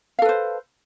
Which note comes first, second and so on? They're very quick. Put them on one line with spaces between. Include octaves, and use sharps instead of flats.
F5 A4 B4 C5